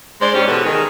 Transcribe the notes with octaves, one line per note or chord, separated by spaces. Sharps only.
G#3 C5 D5
G#2 C#4 G4
B2 E3 F#4 G#4 A4 B4
D#3 G#4